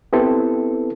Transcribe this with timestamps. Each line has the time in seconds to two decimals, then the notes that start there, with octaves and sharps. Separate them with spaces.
0.13 B3 C4 E4 G4 A4 B4